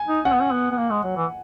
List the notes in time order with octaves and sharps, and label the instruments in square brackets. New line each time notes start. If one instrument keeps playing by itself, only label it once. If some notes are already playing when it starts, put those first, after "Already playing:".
Already playing: [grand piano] G#5
[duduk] D#4
[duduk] C#4 [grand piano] F#5
[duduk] B3
C#4
B3
B3
A#3
G#3
F#3
E3